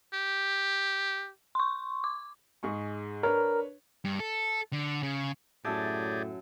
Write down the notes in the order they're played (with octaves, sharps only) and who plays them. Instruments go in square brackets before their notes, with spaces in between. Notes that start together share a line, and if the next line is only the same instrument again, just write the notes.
[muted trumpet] G4
[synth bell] C6 C#6
D6
[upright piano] G#2 G#4 C#6
[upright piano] D4 B4 C#5 [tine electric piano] A#4
[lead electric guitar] G2
A4
D3
C#3
[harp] F#2 E5 A5 [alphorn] A2 [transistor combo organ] G4 G#4 D5